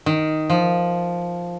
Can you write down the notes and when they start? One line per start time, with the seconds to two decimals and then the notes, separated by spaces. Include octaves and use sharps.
0.06 D#3
0.50 F3